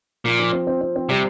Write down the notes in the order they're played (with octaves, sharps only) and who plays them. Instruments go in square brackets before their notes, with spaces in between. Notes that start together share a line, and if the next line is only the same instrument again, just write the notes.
[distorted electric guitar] A#2 [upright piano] F3
[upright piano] F3
C4
C4
C4
C4
[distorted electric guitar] C3 [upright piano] G3